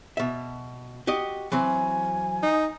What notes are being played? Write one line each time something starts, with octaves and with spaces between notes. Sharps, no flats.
B2 E5
F#4 G4 D#5
E3 F#3 C4 G#5
D#4